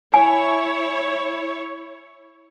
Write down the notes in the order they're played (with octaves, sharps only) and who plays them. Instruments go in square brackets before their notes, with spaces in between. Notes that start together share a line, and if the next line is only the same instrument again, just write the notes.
[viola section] E4 C#5 [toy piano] G#5